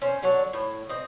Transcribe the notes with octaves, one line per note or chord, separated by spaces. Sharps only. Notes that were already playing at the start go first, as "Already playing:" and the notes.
C#4 C5
D3 F#3 D4 C#5
A2
C4 D#5